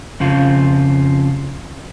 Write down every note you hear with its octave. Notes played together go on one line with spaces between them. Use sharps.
F2 C#3 F3 F4